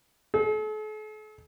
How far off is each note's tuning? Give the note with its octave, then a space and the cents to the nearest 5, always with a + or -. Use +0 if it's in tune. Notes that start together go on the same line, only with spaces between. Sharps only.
A4 -45